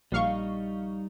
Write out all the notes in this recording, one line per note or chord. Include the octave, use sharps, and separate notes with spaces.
A#1 G3 D#4 F5 C#6